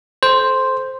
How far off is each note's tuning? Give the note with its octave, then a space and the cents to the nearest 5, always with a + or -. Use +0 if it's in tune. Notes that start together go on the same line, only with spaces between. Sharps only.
A4 -25 C5 +0